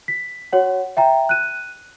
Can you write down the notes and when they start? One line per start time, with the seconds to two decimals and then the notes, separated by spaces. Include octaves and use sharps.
0.08 B6
0.53 F#4 C#5 F#5
0.97 E5 G5 A#5
1.29 F#6 D#7